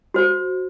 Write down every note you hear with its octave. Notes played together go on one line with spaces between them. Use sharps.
F#4 C5